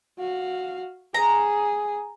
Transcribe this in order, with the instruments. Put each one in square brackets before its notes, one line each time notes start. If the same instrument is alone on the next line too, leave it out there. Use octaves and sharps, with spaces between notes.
[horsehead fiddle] F#4 F5
[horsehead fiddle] G#4 [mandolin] A#5